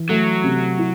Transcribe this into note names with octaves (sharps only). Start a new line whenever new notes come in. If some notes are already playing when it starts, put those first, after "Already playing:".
Already playing: E3
F#3 A3
C3
E4